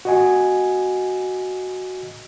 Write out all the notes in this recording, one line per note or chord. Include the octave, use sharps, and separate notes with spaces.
F#4 D#5 G#5